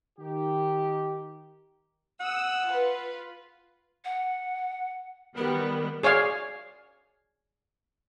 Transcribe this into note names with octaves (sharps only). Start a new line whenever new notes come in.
D#3 G4
F#5 D#6 E6
F4 B4
F#5
D#3 G3 B3 A#4
G#4 C#5 D5 F5